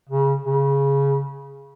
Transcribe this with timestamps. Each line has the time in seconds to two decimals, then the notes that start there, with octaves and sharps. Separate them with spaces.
0.09 C#3
0.45 C#3